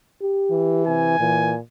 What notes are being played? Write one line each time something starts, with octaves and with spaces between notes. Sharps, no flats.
G4
E3
C3 G#5
A#2 E3